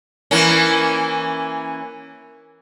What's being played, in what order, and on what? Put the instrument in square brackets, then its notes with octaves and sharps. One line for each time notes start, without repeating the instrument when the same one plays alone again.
[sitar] E3 A#3 C#4